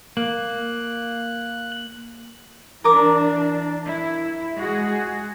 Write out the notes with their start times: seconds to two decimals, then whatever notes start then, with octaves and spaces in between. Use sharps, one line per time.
0.17 A#3 F#6
2.84 E3 D4 A#4 D6
3.85 E4
4.55 G#3 F#4 G#4